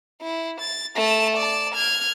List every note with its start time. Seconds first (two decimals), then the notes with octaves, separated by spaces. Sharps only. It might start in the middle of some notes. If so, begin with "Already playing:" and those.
0.22 E4
0.61 A6
0.96 A3 A5
1.36 D5 A5
1.74 F6 G#6